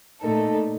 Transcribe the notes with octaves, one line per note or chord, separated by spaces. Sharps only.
A#2 A3 D#4 A4